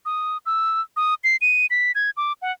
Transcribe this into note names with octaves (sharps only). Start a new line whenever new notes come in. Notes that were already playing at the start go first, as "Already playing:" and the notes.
D#6
E6
D#6
C7
D#7
B6
G#6
D6
F#5